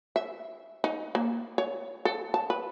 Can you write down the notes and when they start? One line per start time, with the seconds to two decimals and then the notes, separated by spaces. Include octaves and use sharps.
0.16 E5
0.84 D#4
1.15 A#3
1.58 C#5
2.05 A4
2.34 A5
2.50 B4